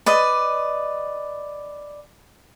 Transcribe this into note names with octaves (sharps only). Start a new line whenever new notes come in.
B4 D5 D#5